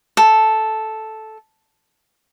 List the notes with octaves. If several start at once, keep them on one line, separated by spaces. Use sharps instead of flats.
A4